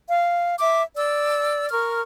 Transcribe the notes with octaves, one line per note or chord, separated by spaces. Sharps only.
F5
E5 D6
D5 E6
A#4 C#6 F6